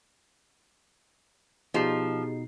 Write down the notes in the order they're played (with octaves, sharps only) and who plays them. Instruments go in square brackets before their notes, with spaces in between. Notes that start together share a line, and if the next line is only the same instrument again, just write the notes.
[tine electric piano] B2 D#4 C7 [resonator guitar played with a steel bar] F3 [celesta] G4 G#4